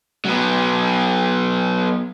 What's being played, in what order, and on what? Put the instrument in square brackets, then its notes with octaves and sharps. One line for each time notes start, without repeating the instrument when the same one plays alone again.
[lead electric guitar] F#3 B3